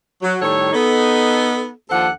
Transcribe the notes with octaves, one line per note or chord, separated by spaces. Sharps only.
F#3
A2 D#3 G3 A4 C#5
B3 D#4 A4
D#2 F3 D4 A4 C5 F#5